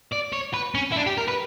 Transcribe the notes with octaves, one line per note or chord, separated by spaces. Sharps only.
D5
C#5
B4
C#4
E4
D4
G4
A#4
B4